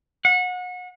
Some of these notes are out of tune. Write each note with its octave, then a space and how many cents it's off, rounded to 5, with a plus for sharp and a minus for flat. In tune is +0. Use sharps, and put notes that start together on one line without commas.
F#5 -30